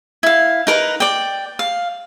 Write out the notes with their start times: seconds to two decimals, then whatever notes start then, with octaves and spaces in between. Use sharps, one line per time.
0.23 E4 F5
0.67 D#4 A#4 B4
1.00 D5 G5
1.59 F5